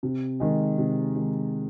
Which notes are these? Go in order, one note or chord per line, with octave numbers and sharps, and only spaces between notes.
C3
D#3 G#3
C3
D#3 G#3